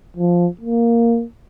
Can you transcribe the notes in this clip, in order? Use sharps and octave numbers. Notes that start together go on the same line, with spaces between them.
F3
A#3